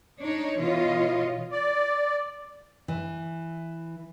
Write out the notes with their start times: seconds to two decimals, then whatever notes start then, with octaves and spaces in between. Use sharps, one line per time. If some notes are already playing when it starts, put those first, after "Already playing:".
0.20 D4 D#4 C#5
0.57 B2 E3 F4 C#5 D#5
1.51 D5
2.88 E3